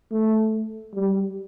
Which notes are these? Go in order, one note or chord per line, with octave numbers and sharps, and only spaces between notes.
A3
G3